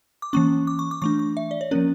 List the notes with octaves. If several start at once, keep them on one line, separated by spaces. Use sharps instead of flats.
D6
E3 A#3 C#4 C#6
D6
C#6
D6
E3 A3 D4 C#6
C#6
E5
D5
C#5
F3 A#3 C#4 A#4